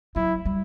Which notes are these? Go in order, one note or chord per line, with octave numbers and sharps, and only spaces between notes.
F#3 E4
G3